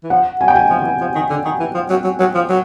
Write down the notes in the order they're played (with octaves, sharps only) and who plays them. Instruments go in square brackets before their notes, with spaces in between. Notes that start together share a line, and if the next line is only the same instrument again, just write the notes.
[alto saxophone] E3
[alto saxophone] F3 [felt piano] F#5
[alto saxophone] F#3 [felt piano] G#5
[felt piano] G5
G#5
[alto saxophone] F3
D#3
E3
F3
D#3
D3
D#3
E3
F3
F#3
F#3
F#3
F3
F#3